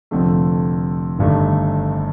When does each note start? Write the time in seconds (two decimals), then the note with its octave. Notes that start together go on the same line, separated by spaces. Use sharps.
0.11 F1 F2 D3 A3
1.18 G1 G2 D#3 A3